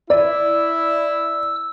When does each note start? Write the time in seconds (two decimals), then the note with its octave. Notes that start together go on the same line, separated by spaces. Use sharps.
0.10 E4 D5 E6